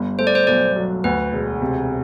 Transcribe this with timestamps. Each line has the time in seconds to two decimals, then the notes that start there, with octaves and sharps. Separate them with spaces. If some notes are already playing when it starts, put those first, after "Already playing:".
Already playing: G1 G3
0.19 A3 C5
0.27 D5
0.35 C5
0.47 B1 D5
0.76 F#3
1.04 D2 B4
1.32 E1
1.62 C3